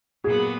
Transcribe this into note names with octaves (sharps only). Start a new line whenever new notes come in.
A#2 F#3 B3 G#4